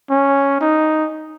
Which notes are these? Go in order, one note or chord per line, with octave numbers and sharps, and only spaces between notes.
C#4
D#4